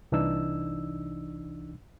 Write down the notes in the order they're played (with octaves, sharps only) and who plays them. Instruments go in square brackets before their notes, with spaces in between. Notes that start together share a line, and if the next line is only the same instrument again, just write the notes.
[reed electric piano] C2 E3 D4 D#4 E6